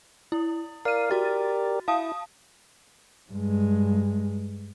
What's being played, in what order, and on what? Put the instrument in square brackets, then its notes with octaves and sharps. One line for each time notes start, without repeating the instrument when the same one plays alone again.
[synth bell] E4
[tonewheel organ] A#4 D5 F5 [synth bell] F6 D#7
[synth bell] F#4 A6 [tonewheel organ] G4 A#4 D5
[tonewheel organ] E4 [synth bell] F5 A5 D#6
[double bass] G2 G#3